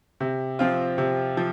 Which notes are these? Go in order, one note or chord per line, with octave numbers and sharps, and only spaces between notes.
C3
F3 C4 F4
C3
F3